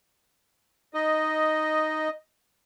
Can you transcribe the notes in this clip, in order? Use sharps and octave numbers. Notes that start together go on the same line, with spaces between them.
D#4 D#5